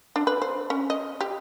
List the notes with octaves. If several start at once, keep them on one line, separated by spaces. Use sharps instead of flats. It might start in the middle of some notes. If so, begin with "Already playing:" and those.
D4
B4
C5
C#4
D#5
G4